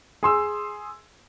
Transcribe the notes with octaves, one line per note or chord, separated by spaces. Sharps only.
G#4 C6 E6